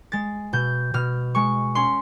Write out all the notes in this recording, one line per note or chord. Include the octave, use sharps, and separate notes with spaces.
G#3 A6
B2 G6
B2 F6
G#3 C#6
C#4 C6